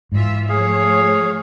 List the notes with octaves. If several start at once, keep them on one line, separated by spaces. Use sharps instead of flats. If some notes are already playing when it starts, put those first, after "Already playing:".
G#2 E3 F4 E5
F3 A3 G#4 C#5 F5